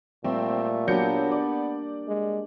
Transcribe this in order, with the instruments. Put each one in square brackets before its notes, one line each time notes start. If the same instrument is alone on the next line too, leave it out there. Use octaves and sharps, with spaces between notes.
[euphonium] A#2 [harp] G3 [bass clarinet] A3 [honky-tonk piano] C4
[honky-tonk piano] F#3 G6 C#7 [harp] A#3 D4 G4 [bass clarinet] B3
[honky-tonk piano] D5
[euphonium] G#3